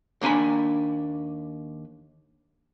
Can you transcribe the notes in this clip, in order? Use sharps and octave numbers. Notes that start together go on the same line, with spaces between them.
D#2 A#3 D4 G#5 B5